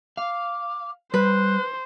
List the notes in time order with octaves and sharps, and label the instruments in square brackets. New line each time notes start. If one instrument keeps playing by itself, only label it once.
[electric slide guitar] F5 [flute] D6
[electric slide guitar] G3 [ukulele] B4 [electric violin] C5 [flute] F#6